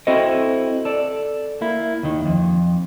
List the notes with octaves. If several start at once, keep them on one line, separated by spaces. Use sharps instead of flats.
C4 E4 F#4 A4 C5 D#5
A4 D5
A#3 E4
D#2 D#3
F2